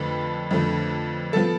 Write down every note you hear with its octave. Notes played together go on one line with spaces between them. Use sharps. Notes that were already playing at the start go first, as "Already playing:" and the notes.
Already playing: F2 D3 A3 B4
F2 D3 A3
F3 B3 A4